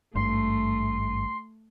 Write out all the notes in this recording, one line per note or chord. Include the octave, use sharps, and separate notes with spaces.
G#1 G2 A3 C6